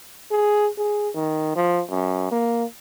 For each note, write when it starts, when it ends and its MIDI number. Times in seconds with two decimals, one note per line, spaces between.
0.31 0.69 68
0.78 1.09 68
1.15 1.54 51
1.56 1.82 53
1.90 2.29 42
2.31 2.65 58